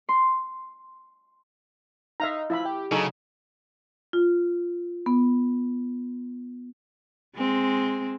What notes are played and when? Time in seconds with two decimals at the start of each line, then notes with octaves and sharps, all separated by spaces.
0.09 C6
2.20 D#4 E5 F5 A#5
2.50 F3 E4 E5 B5
2.65 G4
2.92 C#3 F#3 D#4 G#4 A4
4.13 F4
5.06 B3
7.36 G#3 C4